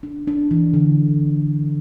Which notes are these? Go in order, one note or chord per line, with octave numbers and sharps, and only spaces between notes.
D4
D4
E3
D3